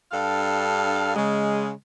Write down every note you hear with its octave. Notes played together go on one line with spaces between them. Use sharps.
G2 D4 A4 F5
C#3 G#3